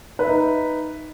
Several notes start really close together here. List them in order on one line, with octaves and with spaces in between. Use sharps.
B4 E5 D#4